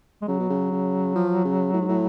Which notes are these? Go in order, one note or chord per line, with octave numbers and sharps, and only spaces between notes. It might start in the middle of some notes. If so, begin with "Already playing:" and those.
G#3
C#3 F#3
B2
C#3
C#3
F3
C#3
A2
G#2
A2